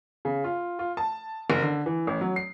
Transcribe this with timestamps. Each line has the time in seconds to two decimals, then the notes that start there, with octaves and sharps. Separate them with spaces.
0.25 C#3
0.44 F4
0.79 F4
0.97 A5
1.50 F#1
1.62 D3
1.86 E3
2.07 A1
2.21 F#3
2.36 C7